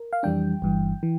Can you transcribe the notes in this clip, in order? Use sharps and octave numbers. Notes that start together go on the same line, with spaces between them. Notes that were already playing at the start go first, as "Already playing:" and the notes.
Already playing: A#4
F5
F2 E3 G3 D4 G5
G1 G2 E3
E3